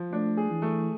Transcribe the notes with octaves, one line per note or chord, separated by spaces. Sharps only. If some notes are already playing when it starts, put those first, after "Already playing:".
Already playing: F3
A3 D4
G#4
E3
A3